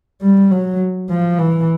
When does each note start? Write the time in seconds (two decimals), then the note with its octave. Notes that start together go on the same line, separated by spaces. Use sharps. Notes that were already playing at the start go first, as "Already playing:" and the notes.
0.22 G3
0.51 F#3
1.10 F3
1.39 E3